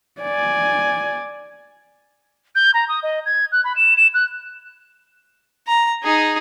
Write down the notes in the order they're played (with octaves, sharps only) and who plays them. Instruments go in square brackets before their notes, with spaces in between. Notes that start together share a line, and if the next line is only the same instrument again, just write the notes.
[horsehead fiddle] D5 G#5
[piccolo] G6
A#5
D#6
D#5
G#6
F#6
B5
E7
E7
F#6
[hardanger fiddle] A#5
D#4 G#4